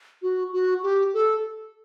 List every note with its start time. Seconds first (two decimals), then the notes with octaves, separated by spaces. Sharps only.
0.22 F#4
0.53 F#4
0.83 G4
1.14 A4